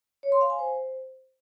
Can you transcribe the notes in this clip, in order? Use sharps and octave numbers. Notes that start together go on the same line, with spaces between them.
C#5
C6
F5
G#5
C5